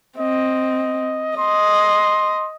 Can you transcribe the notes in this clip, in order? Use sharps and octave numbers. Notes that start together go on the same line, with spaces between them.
C4 D#5
D#5 C6